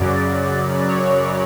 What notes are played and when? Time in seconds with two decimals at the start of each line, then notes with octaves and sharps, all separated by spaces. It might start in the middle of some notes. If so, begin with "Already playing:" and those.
Already playing: F#2 C#3 F#3 D5
0.87 C#5